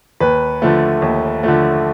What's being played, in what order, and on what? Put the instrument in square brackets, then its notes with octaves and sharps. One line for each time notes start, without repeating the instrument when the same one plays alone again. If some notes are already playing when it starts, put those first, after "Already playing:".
[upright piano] D#2 B4
D3 F3 A3
D#2
D3 F3 A3